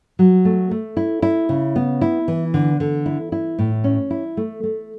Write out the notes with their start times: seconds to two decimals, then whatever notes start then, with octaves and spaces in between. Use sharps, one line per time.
0.19 F#3
0.45 A3
0.71 A3
0.97 E4
1.22 E4
1.49 C#3
1.76 B3
2.01 E4
2.28 E3
2.54 D3
2.80 D3
3.06 E4
3.32 E4
3.58 A2
3.84 C#4
4.11 E4
4.37 A3
4.63 A3